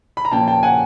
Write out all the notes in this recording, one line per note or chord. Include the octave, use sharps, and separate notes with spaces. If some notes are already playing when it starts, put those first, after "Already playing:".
B5
A#5
A#2 F3 A#3 C#4 G5 A5
G5 A5
F#5 G#5